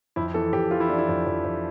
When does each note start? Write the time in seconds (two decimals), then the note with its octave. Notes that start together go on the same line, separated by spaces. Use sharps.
0.16 F2 E4
0.34 E3 A4
0.53 F2 G4
0.71 E3 F4
0.80 E4
0.89 E3 D4
0.98 E4
1.08 F2
1.26 F2
1.45 F2